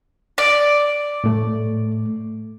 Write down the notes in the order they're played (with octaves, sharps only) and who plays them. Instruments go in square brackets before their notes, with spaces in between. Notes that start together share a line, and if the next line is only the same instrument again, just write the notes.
[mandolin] D5
[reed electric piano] A2 A3